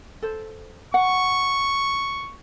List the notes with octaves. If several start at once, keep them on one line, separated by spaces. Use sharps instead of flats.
A4 C5
F#5 C#6